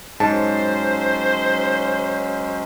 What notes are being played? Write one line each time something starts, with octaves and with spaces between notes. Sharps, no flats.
G#2 F#3 G#3 C#4 C5 A5